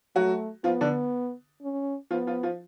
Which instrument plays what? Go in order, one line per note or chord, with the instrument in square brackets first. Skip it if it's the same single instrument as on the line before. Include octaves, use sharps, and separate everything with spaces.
[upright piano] F#3 F#4 [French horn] A3
[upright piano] F3 F4 [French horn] B3
[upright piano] D3 D4
[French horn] C#4
[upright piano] F3 F4 [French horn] B3
[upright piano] F3 F4
F3 F4